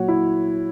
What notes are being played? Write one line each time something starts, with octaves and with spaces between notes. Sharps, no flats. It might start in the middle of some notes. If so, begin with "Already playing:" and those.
Already playing: A#2 F#3 F#4 C#5
E4